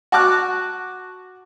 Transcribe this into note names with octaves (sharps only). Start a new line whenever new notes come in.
F#4 A5 C#6 D6 F6 F#6